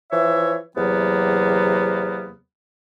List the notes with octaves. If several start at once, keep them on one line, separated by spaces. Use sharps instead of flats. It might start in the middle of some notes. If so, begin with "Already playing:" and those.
E3 F3 C#5 E5
E2 C3 F#3 A#3 B3